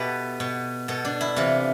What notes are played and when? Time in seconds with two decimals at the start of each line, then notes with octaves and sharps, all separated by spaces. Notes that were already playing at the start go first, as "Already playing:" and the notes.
Already playing: B2 E4 G4 A4 B4
0.40 B2
0.88 B2 A4
1.05 D4
1.21 E4
1.36 C3 E3 F4